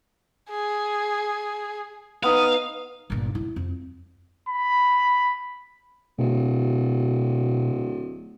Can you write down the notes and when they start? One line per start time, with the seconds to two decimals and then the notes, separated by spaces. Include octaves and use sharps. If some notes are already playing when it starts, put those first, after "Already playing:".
0.50 G#4
2.23 B3 D#4 F5 D#6
3.10 G1 A#2
3.35 E4
3.56 F2
4.49 B5
6.18 D1 B2